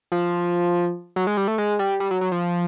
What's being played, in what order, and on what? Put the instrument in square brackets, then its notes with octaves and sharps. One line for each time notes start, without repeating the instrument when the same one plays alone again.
[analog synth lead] F3
F#3
G#3
G3
A3
G#3
G3
G3
F#3
F#3
F3